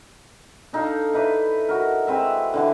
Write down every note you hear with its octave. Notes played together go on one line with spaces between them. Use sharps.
D4 D#4 A4 F5
D#4 E4 B4 D5
F#4 A#4
G#3 C4 B4 E5
D3 E3 A5